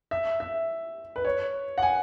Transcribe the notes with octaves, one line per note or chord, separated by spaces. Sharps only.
E5
E5
B4
C#5
F#5
G#5